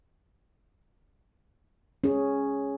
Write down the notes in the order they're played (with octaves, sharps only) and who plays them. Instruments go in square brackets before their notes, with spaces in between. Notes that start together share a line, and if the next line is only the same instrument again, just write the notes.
[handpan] C#4 G#4